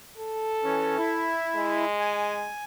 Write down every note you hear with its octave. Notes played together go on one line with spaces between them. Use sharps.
A4
E3 C#4
E4
G#3
G#5